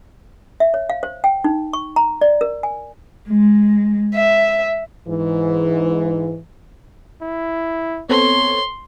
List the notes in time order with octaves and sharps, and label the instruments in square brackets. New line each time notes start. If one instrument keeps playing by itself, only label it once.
[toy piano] E5
C#5
F5
C5
G5
D#4
C#6
A#5
D5
A#4
G#5
[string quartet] G#3
E5
[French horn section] G#2 E3
[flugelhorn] E4
[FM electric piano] B3 C4 A4 [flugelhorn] C#5 [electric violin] C6